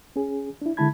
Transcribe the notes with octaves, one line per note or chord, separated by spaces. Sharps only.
C#4 G#4
D4 E4
D3 G#3 E4 A5 B5 G#6